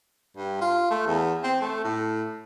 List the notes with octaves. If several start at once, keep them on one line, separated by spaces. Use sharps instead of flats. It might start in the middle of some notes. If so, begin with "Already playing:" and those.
G2
F4
A3
E2
C4
A3
A2